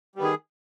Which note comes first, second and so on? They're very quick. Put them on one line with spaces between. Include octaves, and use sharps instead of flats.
G3 B3 D#3 G#4